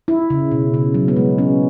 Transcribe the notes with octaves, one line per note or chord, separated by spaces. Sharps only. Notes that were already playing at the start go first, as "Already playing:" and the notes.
E4
C#3
B2
C#3
F#3
B3
G#3
C#4